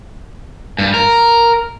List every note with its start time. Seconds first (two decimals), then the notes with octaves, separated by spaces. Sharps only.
0.78 G2
0.94 A#4